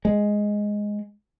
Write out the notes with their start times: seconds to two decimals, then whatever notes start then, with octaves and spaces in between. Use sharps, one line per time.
0.05 G#3